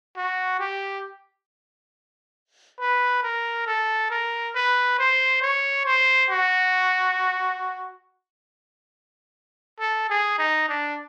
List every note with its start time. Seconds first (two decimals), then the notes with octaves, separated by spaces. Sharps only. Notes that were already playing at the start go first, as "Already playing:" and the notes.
0.17 F#4
0.60 G4
2.80 B4
3.23 A#4
3.67 A4
4.10 A#4
4.55 B4
4.99 C5
5.42 C#5
5.86 C5
6.30 F#4
9.80 A4
10.10 G#4
10.38 D#4
10.69 D4